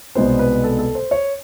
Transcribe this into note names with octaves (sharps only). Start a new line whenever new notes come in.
C2 B2 G#3 B3 D#4 C5
B4
A4
A4
C5
C#5